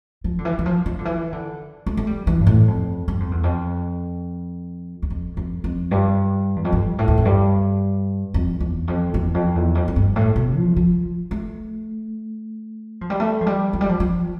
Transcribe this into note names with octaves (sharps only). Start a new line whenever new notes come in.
F3
D3
E3
E3
F3
F3
D3
E3
D3
A3
A3
G3
E3
G2
A2
F2
G2
F2
E2
F2
E2
F2
F2
F2
G2
E2
F2
G2
A2
E2
F2
G2
F2
E2
F2
E2
F2
E2
F2
F2
G2
A2
B2
F3
F3
A3
F3
G3
A3
F3
G3
F3
G3
F3
F3